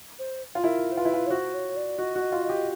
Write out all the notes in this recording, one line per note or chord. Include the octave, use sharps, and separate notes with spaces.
C5
F4
E4 A#4
C5
F4 B4
E4
F4
C#5
F#4 C5
C#5
D5
F#4 D#5
F#4
D#5
F4
D#5
G4